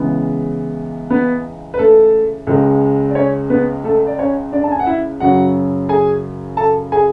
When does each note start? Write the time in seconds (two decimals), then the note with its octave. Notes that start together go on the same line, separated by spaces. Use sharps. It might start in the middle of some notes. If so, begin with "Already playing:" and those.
Already playing: C#2 C#3 E3 G#3 B3
1.10 B3 B4
1.74 B4
1.79 A3 A4
2.47 C#2 C#3 G#3
3.09 D5
3.15 C#4 C#5
3.50 B3 B4
3.84 A3 A4
4.07 D5
4.19 C#4 C#5
4.52 D4 D5
4.64 A5
4.72 G#5
4.80 F#5
4.86 E4 E5
5.20 F#2 C#3 F#3 F#4 F#5
5.89 G#4 G#5
6.57 A4 A5
6.92 G#4 G#5